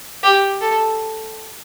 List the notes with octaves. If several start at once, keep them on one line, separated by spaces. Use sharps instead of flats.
G4
A4